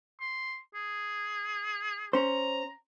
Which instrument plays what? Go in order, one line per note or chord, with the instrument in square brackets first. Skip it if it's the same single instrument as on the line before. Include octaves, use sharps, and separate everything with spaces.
[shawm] C6
G#4
[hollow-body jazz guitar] C#4 C5 [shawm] A#5